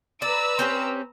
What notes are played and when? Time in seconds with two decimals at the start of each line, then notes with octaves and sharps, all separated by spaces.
0.22 B4 D5 A#5 E6
0.59 C4 C#4 G4